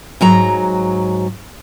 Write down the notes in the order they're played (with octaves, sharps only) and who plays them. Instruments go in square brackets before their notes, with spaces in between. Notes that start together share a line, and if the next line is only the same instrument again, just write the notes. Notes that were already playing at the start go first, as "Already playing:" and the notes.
[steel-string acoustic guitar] G#2 F#3 A#5